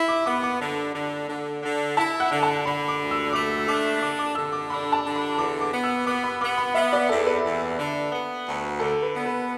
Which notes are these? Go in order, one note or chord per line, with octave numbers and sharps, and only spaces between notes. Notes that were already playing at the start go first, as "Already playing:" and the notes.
Already playing: E4 B5
D6
B3 D6
D6
D3
D3
D3
D3
E4 A5
F#5
D3
A5
D3 B5
D6
D2
E6
A3 D6
D4 D6
D3 D6
D6
D3 E6
D6
D4 B5
A5
D3
B5
E2 D6
D6
B3
E6
B3 D6
B5
B3 D6
B5
B3 E5
D5
E2 A4
B4
E2
D3
B3
D2
D3 A4
B4
B3
B4